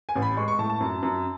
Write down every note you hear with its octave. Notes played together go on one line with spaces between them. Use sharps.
G#5
A1
B5
G#3 C#6
C#6
A2 A5
A5
F#2
F#2